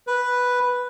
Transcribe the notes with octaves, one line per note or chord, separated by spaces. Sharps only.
B4